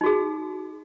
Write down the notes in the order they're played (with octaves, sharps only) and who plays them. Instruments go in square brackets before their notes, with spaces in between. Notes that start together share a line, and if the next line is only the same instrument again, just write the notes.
[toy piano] D#4
F#4
G#4